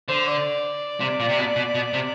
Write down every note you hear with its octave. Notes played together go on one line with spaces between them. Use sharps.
D3 C5
D5
C3
A#2
C3
B2
B2
B2
C3